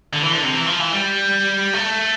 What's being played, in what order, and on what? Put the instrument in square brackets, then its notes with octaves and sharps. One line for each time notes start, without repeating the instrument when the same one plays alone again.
[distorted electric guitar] D3
E3
D3
C3
E3
F3
E3
G3
A3